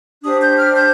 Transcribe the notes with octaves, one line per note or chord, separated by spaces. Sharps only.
D4 G4 C5 D#6
G6
F6
G6